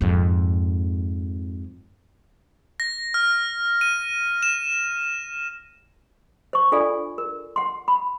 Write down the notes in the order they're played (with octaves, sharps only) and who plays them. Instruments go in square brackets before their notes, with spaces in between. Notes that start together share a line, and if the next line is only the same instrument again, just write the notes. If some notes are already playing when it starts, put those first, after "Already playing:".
[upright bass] F2 G#2
[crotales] A#6
F6
D#7
E7
[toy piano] C5 C#6
D4 F4 A4 D5 F5 G#5
A#4
F#5 C6
B5